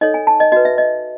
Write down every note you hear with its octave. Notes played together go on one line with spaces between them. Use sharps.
D#4 A4 C#5 D#5
G#5
A5
D#5
F#4 B4 D#5
E5
D#5